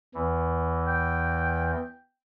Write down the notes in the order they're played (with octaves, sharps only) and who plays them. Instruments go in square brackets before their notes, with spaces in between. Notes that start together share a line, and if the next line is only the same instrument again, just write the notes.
[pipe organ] E2 E3
[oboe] G5